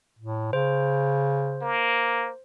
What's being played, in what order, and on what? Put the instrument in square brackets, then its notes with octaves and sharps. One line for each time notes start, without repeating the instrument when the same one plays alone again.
[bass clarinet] A2
[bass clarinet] C#3 [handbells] C5
[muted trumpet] A#3